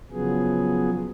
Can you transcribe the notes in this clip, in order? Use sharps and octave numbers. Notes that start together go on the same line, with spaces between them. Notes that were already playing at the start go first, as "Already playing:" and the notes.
C#3 F3 F#3 B3 G#4